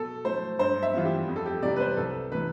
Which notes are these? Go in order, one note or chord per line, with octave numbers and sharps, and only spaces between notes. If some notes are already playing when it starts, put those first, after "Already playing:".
Already playing: B2 A4
A3 C5
G2 C5
E5
E3 G3 B3 F4
G4
F2
A4
G4
C3 G3 B3 D5
B4
C5
C2 A4
C3 E3 A3 B4